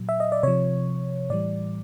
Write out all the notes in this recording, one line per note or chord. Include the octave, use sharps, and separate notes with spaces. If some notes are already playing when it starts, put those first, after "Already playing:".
Already playing: A#2 F#3
E5
D#5
D5
C3 F3 C#5
A2 E3 G3 D5